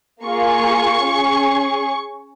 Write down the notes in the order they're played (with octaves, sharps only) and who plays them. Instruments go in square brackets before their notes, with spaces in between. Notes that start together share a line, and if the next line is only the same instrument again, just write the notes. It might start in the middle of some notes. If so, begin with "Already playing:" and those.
[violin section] A#3 F4 G#4 C#6
C#4 G#4